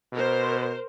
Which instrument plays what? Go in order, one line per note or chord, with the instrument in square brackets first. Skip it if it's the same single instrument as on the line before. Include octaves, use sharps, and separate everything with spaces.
[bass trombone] B2 [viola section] A#4 C5